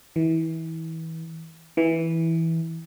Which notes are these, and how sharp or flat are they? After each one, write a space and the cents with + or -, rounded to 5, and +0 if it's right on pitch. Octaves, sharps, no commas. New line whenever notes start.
E3 -30
E3 -10